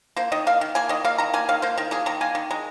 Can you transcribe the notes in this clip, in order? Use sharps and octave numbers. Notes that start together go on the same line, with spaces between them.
A#3 C5
D#3 D#5
A#3 F5
D#3
A#3 G#5
D#3 D#5
A#3 F5
D#3 A#5
A#3 G#5
D#3 F5
A#3 C5
D#3 A#4
A#3 G#4
D#3 A#5
A#3 G#5
D#3
G#3 A#5